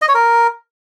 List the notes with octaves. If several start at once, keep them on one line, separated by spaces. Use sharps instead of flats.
D#5
C#5
A#4